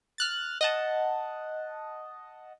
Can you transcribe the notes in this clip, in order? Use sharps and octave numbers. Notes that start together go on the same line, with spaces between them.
F6 F#6 A6
D#5 F#5 A5